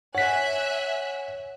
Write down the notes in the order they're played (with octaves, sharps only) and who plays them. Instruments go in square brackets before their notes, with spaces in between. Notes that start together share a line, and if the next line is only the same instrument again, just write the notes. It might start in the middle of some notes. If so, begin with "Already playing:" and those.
[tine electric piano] C#5 B6 [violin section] E5 G#5 F#6 [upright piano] F#5